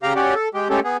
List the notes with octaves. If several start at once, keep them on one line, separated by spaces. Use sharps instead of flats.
C#3 G4 F5 A#5
C#4 F#4 G4 D5
A4
G#3 G4
G#3 A3 C#4 G4 A4
B3 G#4